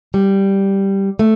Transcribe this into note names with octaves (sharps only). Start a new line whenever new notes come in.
G3
A3